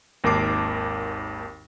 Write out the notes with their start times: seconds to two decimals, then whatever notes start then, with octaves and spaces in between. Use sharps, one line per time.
0.24 G#1 D#2 A#4 A5 D6 C7